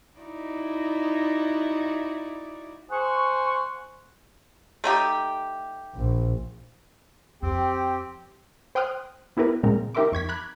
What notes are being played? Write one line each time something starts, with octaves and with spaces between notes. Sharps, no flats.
D#4 E4 F#4 D5
C5 F#5 G#5 C#6
A3 D#4 G4
A#1
F2 C4 G4
C5 G5 C6 D#6 F6 F#6
B3 E4 G4 A#4 B4
A#2 C#3 G#3 C4 A#4
D#4 G4 A#4 E5 C6 D6
F2 C#6 G#6 B6
A#5 B5 D6 F#6 G#6